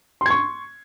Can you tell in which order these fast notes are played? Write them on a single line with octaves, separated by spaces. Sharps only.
C6 G#6 C#6